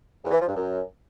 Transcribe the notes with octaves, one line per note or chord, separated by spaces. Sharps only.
E2
E3
F3
G2
F#2